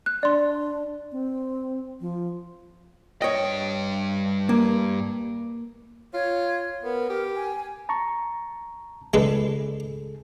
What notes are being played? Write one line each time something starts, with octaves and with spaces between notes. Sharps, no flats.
F#6
D4 D5 C6
C4
F3
G2 C#5 D#5 G5
A#3
F4 C#5
B3 A#4
G4
G#5
A5 A#5 C#6
C#2 G#3 D4 G#4 A4 B4